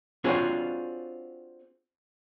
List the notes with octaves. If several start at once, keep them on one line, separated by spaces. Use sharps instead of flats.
C4 D4 F4 F#4 G#4 C#5